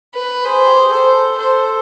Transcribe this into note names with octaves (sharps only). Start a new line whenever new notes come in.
B4
G#4 C5
G4
G#4
A4 C5
A4 C5